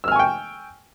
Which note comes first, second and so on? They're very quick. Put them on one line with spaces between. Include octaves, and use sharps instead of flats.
E6 F6 G#5 C#6 G5